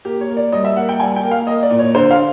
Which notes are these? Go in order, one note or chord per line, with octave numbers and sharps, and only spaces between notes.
A#3 G4
C#5
A#3
D5
G3 D#5
E5
A#3 F#5
G5
G3 G#5
G5
A#3
F5
A#3 D#5
D5
A#2
C#5
D3 C5
F5